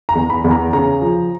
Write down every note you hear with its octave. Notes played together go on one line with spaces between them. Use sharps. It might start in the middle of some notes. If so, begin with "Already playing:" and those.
A#5
E2
B5
E2
A#5
C#3 A#5
F3